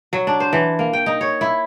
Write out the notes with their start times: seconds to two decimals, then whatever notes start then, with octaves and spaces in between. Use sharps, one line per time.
0.13 F#3
0.27 D4
0.40 C5
0.53 E3
0.79 A#3
0.93 G5
1.06 D#4
1.21 C#5
1.41 E4